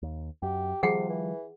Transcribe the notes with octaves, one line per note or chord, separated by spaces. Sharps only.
D#2
F#2 G4
C3 D#3 F3 G3 G#4 F#5 G5
E3